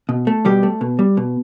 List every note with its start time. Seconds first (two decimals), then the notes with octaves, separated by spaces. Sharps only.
0.09 B2
0.27 A3
0.45 B2 G3 G4
0.63 A3
0.81 B2
0.99 G3
1.17 B2